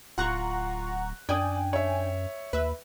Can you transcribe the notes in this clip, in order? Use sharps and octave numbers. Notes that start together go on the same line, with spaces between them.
D1 F4 F#5 A#5 C#6 F#6
F#2 D4 D5 G5 G#5 D#6
C#5 E5
D#2 B4 E5